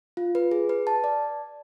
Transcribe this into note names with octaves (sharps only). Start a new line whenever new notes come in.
F4
B4
G#4
B4
A5
D5